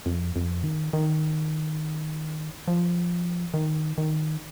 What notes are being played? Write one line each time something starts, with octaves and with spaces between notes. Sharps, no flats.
F2
F2
D#3
D#3
F3
D#3
D#3